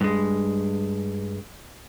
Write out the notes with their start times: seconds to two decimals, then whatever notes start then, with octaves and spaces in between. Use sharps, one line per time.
0.01 G2 G#3